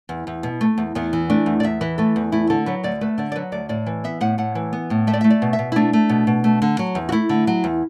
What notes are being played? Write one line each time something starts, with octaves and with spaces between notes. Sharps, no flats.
E2
E2
B2
A3
E2
E2 B3
E3
A3 D4
E2
D5
E2 E5
E3 B4
A3 A4
E2
A3 E4
D3 A4
F#3 B4
D2 D5
A3 B4
D3 D5
D5
F#3 B4
D2 D5
A2 D5
E3
B3 E5
A2 F#5
A2 F#5
E3
B3
A2
A3 E5
D5
A3 E5
D5
B2
E5
B2
E4
A3 D4
A3
B2
B2
A3
D3
F#3
E2
F#4
A3 E4
D3
F#3
E2